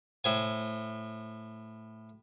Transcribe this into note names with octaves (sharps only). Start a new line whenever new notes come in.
A2 C5 G#5